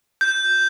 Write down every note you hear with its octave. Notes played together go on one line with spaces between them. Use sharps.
G6